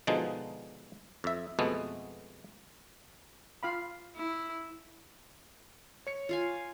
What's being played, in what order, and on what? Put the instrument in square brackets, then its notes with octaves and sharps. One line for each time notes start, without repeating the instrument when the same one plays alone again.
[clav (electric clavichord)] B2 D3 F3 G#3 D#4
F2 E5
F2 B2 G#3 A3 B3
[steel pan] F4 F5 B5
[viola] E4
[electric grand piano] C#5 C#7
[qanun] F4 F5 G#5